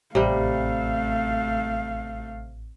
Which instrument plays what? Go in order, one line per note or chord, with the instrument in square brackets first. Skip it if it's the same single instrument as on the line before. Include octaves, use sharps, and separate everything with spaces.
[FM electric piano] A1 [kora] C3 G3 [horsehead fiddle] A3 F5